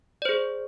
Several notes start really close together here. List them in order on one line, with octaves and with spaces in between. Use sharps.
D5 C5 G#4